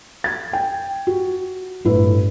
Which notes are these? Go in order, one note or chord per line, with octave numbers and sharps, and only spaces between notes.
G#6 A6
G5
F#4
G1 A2 E4 B4